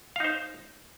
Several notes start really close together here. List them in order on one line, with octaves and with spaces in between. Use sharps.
F5 D#4 C5